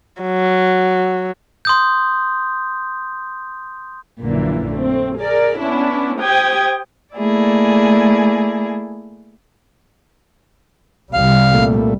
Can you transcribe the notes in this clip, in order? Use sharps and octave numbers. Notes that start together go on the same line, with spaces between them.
F#3
C6 D#6 G6
A#1 F#2 A#2 D3 E3 A#3
A3 C4
G#4 A#4 D5
B3 C#4 D4 E4
G4 C5 G5 D#6 G#6
A3 A#3 E4 G#4 D5
C2 C3 G3 F5
A#2 A3